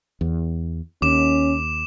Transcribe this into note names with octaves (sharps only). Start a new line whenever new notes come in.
E2
D#2 C#4 D6 E7